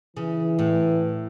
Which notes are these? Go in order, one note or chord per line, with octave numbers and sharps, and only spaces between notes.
C#3 E3
A2